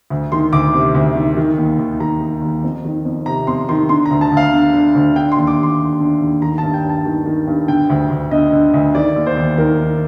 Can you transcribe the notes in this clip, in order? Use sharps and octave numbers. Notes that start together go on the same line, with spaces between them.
D2
D#3 C6
D2 D6
C3
D2
D#3
D#3
D#2
D#2
D#3 A#5
D#3
D#2
F2
D#3
F2
C3 A#5
F2 C6
D#3 C6
D3 C6
A#5
D2
A5
D2
F5
D3
D3
D2
D3 G5
C6
D#2
D6
D#2 C6
D3
D3
D#2
D#3 A#5
A5
G2
G5
G2 A5
D#3
D#3
G2
D3 G5
D2
D2
D3 D#5
D3
D2
D#3 D5
D#2
C5
D#2
D#3 A#4
D#3